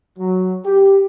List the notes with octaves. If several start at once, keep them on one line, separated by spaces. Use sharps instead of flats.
F#3
G4